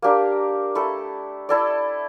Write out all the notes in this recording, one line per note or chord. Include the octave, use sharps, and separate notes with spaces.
A#3 D4 G4 A#4
A3 E4 A4
E4 A4 D5